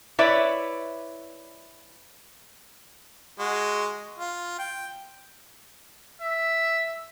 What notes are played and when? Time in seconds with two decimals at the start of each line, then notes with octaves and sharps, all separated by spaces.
0.19 E4 B4 C#5 D5 E5
3.39 G#3 F#4
4.18 F4
4.59 G5
6.22 E5